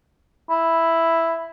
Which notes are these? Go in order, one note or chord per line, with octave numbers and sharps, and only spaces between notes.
E4